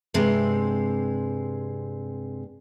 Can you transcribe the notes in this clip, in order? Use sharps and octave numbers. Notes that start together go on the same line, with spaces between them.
G2 C3 G#3 C4